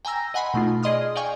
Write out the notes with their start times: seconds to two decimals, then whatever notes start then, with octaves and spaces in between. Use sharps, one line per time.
0.05 G5 G#5 A#5 E6 A#6
0.34 D#5 F#5 G#5 B5 C6
0.54 B2 A3 D#4 F4
0.83 G#4 D5 D#5 C6 D#6 F6
1.15 D5 D#5 F5 G5 G#5 C#6